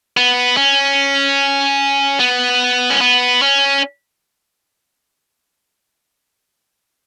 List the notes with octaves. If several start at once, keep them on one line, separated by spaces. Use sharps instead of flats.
B3
C#4
B3
C#4
B3
C#4